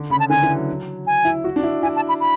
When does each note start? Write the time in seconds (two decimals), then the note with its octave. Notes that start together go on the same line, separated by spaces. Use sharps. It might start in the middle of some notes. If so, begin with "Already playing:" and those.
Already playing: D3
0.10 C#3 B5
0.20 A5
0.30 D3 G#5
0.42 E3
0.55 F#3
1.07 G#5
1.25 E4
1.44 F#4
1.56 D4
1.63 E4
1.83 E4 G#5
1.96 A5
2.09 B5
2.20 B5